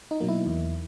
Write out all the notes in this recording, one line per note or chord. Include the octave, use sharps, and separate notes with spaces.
D#4
B2 F#3 A#3
E4
E2